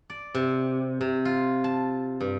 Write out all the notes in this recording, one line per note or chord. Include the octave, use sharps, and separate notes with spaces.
D5
C3
C3
F4
A5
G2